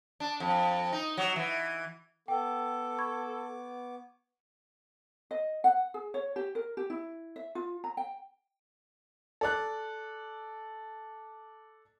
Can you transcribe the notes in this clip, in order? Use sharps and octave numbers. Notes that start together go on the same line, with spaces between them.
D4
F2
D#4
F#3
E3
B3 A4 G5 D6
B5 C#6 G#6
D#5
F#5
G#4
C#5
G4
A#4
G4
E4
E5
F4
A#5
G5
A4 D5 F#6